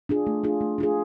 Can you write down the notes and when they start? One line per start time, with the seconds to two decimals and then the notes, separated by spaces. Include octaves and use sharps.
0.09 D4 F4 G#4
0.27 A3
0.44 D4 F4 G#4
0.61 A3
0.78 D4 F4 G#4